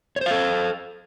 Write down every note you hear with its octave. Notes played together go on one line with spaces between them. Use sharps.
A4 C5 C#5 F5